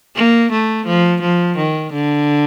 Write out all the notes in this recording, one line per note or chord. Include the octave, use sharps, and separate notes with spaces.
A#3
A3
F3
F3
D#3
D3